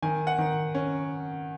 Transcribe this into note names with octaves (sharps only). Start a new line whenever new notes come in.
D#3 G#5
F#5
D#3
C#4